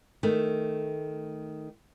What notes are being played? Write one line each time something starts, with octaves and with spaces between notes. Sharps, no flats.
D#3 A3